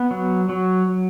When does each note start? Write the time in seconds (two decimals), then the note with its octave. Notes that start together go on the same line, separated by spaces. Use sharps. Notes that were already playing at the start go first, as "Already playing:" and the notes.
Already playing: B3
0.11 F#3
0.49 F#3